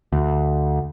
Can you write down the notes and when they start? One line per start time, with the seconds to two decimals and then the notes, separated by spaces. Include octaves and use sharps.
0.12 D2